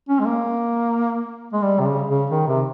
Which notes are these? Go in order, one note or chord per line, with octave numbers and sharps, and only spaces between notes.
C#4
G#3
A#3
G#3
G3
C3
C#3
C#3
D#3
C3